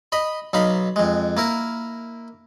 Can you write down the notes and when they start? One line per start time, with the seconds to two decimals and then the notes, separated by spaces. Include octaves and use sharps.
0.12 D#5 B5
0.53 B1 D#4 F5 B5
0.96 F2 G#3
1.37 A#3 E4 A#4